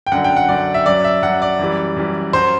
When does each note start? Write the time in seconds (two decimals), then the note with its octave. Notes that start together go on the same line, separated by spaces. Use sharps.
0.07 G5
0.12 F#2 D3 F#3 F#5
0.24 G5
0.36 F#5
0.49 F#2 D3 F#3 D5
0.74 E5
0.86 F#2 F#3 D5
1.04 E5
1.22 F#2 F#3 F#5
1.42 D5
1.59 F#2 E3 G3
1.96 F#2 E3 G3
2.33 F#2 F#3 C5